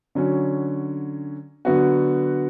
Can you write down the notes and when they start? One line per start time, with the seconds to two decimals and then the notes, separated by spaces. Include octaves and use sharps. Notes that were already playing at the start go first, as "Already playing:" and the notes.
0.15 D3 F#3 C#4
1.65 D3 F#3 B3 F#4